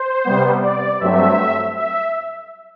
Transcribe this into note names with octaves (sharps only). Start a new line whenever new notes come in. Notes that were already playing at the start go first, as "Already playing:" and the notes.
Already playing: C5
C3 G3 B3
D5
G2 F#3 A3 C4 E5
E5